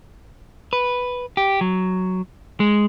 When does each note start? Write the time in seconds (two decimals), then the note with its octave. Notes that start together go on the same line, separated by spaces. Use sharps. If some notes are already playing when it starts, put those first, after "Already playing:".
0.73 B4
1.37 G4
1.61 F#3
2.60 G#3